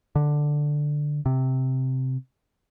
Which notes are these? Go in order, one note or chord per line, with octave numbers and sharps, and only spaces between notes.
D3
C3